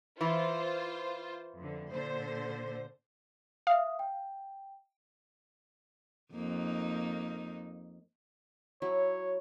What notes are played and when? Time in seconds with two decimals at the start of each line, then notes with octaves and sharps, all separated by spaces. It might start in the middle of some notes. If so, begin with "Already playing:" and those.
0.21 E3 F4 C5
1.59 F2 D3
1.91 A#2 D3 C5
3.67 E5 F5 D#6
3.99 G5
6.34 F2 A#3 D#4
8.82 F#3 E4 C#5